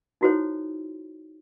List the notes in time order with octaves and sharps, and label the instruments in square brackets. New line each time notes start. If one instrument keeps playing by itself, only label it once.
[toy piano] D#4 E4 F#4 A4 C5 C#5